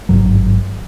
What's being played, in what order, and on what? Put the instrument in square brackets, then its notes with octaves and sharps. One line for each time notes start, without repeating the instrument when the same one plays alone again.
[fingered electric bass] G#1 C#2 G2 F#3